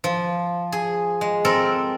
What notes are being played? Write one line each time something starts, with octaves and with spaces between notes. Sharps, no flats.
F3
G#4
G#3
C4 A4 A#4